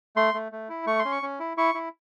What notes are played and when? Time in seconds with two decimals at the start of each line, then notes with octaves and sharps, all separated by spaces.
0.16 A3 C6
0.34 A3
0.52 A3
0.69 E4
0.86 A3 C#6
0.99 C6
1.05 C#4
1.12 C#6
1.23 C#4
1.40 E4
1.57 E4 C#6
1.75 E4